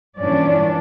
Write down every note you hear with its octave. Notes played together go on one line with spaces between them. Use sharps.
G2 A#2 E3 C#4 D4 D5